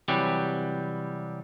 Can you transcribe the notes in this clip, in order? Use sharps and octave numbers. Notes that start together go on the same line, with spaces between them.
C3 E3 F#3 G3 G4